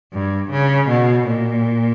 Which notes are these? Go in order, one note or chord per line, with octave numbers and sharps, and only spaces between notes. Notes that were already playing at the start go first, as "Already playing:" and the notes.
G2
C#3
B2
A#2